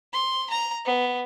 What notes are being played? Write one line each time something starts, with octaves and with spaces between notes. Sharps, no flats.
C6
A#5
B3